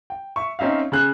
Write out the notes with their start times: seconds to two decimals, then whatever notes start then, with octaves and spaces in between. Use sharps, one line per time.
0.10 G5
0.36 E5 C#6
0.59 C4 C#4 D#4 E5 F5
0.92 C#3 G#4 F#6